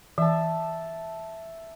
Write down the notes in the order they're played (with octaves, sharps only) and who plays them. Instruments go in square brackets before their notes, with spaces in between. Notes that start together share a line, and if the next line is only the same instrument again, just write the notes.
[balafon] E3 [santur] E5 A5